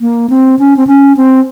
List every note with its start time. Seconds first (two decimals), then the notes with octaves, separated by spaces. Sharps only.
0.01 A#3
0.30 C4
0.59 C#4
0.77 C4
0.87 C#4
1.17 C4